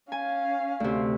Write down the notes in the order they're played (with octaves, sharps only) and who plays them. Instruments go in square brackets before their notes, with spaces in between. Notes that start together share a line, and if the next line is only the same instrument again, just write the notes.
[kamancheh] C#4 F5 [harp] G#5
[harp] D2 C3